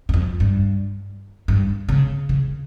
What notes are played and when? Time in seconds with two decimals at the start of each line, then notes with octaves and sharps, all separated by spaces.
0.09 F#2
0.14 F2
0.40 G2
1.48 G2
1.89 C#3
2.29 C#3